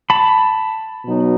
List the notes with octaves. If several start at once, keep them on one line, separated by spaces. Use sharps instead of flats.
A5 B5
B2 F#3 B3 D#4